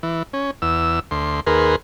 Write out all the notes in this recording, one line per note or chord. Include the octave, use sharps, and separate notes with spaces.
E3
C#4
E2 E6
D2 C6
D#2 G#4 A#4 B4 C6